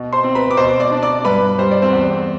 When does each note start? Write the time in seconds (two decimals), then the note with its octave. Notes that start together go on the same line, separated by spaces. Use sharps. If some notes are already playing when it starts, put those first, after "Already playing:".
Already playing: B2
0.13 C5 C6
0.24 C4
0.35 B4 B5
0.51 D6
0.57 B2 C5 C6
0.80 D5 D6
0.91 D4
1.02 D5 D6
1.25 G2 B4 B5
1.58 G3 C5
1.71 D5
1.82 C4 C5
1.93 E2